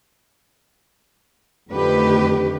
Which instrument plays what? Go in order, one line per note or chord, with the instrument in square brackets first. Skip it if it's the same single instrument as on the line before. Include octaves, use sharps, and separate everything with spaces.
[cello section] F2 D3 D#3 A3 G4 B4